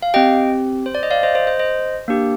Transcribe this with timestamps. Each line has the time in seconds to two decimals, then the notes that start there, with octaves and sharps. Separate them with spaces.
0.02 F5
0.14 C4 G4 D#5 G5
0.86 C5
0.95 D5
1.03 D#5
1.11 D5 F5
1.23 C5 D#5
1.35 C5 D#5
1.47 C5 D#5
1.60 C5 D#5
2.08 A#3 D4 G4